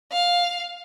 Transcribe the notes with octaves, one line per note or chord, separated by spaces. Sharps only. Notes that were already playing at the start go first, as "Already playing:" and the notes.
F5